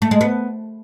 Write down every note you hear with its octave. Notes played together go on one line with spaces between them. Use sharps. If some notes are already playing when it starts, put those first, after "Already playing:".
A3
G#3
B3